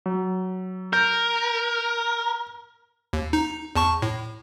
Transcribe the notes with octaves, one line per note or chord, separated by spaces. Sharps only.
F#3
A#4 G6
D#2
D#4
E2 A5 C#6
A2